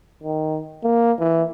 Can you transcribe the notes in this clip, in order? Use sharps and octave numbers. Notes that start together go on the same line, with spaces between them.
D#3
A#3
E3